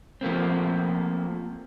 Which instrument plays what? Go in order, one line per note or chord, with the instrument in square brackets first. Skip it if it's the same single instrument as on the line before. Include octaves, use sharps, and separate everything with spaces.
[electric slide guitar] F3 A3 A#3 C4